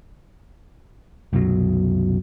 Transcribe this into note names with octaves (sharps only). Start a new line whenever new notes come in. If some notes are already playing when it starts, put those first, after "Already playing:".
C2 F#2 B2 F#3